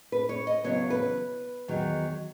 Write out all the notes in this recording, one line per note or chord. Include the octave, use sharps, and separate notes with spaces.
B4
C#5
D#5
E2 C#3 F#3 B3 C#5
B4
E2 D#3 F#3